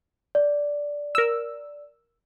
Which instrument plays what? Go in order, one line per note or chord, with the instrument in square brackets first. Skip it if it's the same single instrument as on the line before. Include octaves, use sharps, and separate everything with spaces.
[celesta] D5
[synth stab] A#4 E6